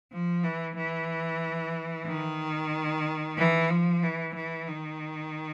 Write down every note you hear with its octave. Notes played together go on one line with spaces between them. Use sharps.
F3
E3
E3
D#3
E3
F3
E3
E3
D#3